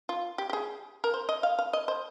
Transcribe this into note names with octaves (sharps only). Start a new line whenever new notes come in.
F4
G4
G4
G#4
A#4
C5
D#5
F5
F5
D#5
C5